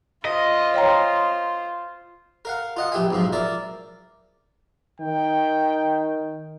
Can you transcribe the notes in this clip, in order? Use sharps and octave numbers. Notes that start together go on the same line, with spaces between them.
F4 C5 D#5
C#5 G5 A#5
A#4 F5 F#5
F4 D#5 F#5
A#1 G4 E5 G#5
B1 G#2 F3
A#4 D5 E5
D#3 G5